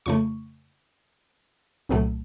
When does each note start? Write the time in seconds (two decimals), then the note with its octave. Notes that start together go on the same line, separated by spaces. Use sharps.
0.06 F2 C#3 A3 C#6
1.89 C2 A#2 F#3 A3